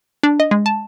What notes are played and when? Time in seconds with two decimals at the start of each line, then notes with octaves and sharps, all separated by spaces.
0.23 D4
0.40 D#5
0.51 G#3
0.66 A5